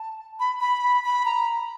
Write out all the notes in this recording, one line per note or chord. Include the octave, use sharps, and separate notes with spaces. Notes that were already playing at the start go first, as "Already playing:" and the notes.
Already playing: A5
B5
B5
B5
A#5